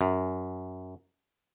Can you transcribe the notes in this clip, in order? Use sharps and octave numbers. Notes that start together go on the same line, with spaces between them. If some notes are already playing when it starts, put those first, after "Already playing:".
F#2